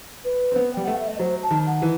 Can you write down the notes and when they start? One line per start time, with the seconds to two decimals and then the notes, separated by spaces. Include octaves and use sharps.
0.24 B4
0.52 C4
0.56 B3
0.73 G3 G5
0.84 A3 F#5
0.96 E5
1.07 D#5
1.19 F#3 C5
1.43 A5
1.51 D#3
1.66 F#5
1.82 E3